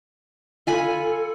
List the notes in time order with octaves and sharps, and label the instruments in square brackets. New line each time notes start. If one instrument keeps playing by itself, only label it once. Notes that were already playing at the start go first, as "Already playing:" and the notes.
[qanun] F4 G#5 B5 [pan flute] A4